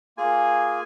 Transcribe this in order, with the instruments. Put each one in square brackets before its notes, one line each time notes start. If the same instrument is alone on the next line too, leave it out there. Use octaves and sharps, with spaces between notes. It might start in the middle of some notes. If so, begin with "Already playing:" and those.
[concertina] A#3 F4 G#4 G#5